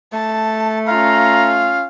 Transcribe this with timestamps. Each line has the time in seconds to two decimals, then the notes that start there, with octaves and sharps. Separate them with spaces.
0.13 A3 A5
0.88 C#4 F4 F5 A#5